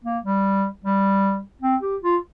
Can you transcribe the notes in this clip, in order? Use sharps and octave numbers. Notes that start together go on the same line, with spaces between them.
A#3
G3
G3
C4
G4
F4